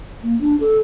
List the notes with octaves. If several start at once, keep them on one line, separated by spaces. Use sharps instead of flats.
A#3
D4
A4